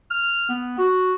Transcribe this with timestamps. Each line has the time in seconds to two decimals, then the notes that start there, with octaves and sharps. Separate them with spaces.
0.11 F6
0.49 B3
0.78 F#4